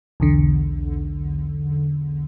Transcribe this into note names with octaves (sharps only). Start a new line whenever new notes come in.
B1 E2 D3